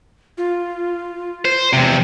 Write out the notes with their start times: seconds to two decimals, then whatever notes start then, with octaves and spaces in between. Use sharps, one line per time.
0.38 F4
1.45 C5
1.73 E2 C3